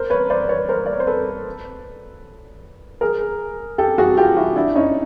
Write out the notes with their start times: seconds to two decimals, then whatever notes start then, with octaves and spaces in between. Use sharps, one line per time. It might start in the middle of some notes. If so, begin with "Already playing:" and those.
Already playing: A#4 C5
0.10 B4 C#5
0.30 C5 D5
0.49 B4 C#5
0.69 A#4 C5
0.86 D5
0.93 C#5
1.00 C5
1.07 A4 B4
3.01 G#4 A#4
3.78 G4 A4
3.98 F#4 G#4
4.17 F4 G4
4.37 E4 F#4
4.56 D4 E4
4.75 C#4 D#4